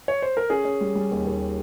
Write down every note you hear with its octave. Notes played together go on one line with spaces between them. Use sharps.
C#5
C5
A#4
C#4 G#4
C#4
G3
G3
D#2
D#2